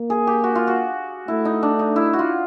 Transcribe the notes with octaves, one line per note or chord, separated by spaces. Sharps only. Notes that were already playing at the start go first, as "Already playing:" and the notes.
Already playing: A#3
G#4
G4
F#4
F4
F#4
A3 E4
D#4
D4
D#4
E4
F#4
F4